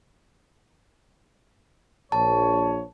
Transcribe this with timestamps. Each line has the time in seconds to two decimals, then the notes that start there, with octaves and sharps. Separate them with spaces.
2.12 A#1 C#5 A5